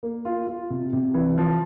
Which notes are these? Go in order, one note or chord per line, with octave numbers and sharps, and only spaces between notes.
A#3
F4
F4
C3
C3
E3
F3